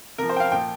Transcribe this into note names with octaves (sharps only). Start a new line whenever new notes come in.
C3 F3 A#4
C5
G5
F5
A#2 F3 G5